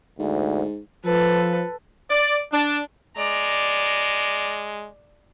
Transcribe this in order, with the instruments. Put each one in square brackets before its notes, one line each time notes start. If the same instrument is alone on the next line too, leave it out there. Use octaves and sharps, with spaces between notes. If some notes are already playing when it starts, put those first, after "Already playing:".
[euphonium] D2 [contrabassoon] G#2
[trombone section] F3 [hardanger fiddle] A4 B4
[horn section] D5
D4
[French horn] G#3 [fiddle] D5 A#5